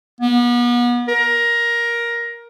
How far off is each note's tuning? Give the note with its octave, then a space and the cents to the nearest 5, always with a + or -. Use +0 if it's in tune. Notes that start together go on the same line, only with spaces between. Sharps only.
B3 -35
A#4 +15